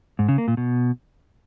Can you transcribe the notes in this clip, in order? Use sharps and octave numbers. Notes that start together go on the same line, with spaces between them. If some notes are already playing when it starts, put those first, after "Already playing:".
G#2
C#3
A#3
A#2
B2